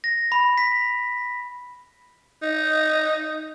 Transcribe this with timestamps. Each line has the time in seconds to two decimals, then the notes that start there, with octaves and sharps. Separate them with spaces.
0.04 A#6
0.32 B5
0.58 B6
2.43 D#4